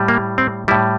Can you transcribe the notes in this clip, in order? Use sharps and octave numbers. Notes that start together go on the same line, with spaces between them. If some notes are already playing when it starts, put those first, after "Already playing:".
Already playing: A2 G3
A#3
C4
A2 G3 E4